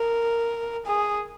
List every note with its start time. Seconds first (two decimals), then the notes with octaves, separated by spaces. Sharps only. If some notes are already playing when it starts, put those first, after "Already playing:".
Already playing: A#4
0.86 G#4